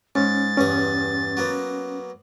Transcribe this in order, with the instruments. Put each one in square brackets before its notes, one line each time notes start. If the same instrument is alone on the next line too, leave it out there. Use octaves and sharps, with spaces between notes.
[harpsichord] G#2 [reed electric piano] C#4 [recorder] A6
[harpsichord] E2 G2 G#4 [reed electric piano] C#4
[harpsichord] F#3 A#3 B3